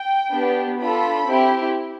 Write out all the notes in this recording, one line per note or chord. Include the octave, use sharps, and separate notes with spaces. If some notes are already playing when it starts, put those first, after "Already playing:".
Already playing: G5
B3 D4 G4
D4 F4 A4 B5
C4 E4 G4